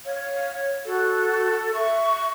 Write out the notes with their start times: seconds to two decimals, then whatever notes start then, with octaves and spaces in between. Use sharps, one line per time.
0.05 C#5 F5
0.85 F#4 A4
1.74 E5 C#6